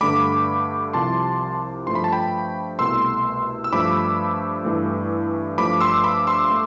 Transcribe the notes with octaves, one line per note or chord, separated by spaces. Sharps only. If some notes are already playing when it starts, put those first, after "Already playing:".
G2 D3 A3 B5 D6
C2 C3 F3 A5 C6
G2 F3 A3 C6
B5
A5
G5 B5
C2 B2 A3 C6 E6
E6
G2 F3 A3 B5 D6
G2 E3 A3
G2 F3 A3 B5 D6
C6 E6
B5 D6
C6 E6
A3